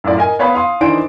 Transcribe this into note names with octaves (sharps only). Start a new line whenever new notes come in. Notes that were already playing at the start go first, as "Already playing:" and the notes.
F#2 A2 F4 D5
A#4 D#5 G#5
B3 C#5 F5 B5 D#6
F5 C6 D#6
D#3 E3 D4 D#4 C5 D7